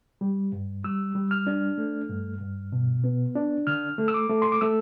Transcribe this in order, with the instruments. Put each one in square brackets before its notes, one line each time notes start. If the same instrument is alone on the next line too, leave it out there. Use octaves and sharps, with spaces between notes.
[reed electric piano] G3
G2
G3 E6
G3
F6
D4
A3
G2
G2
B2
B3
D4
D3 F6
A3
E6
D6
A3
C6
D6
A3 E6